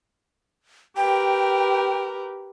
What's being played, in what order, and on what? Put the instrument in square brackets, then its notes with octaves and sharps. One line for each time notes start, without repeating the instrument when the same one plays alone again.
[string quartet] G4 A#4 B4 [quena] G5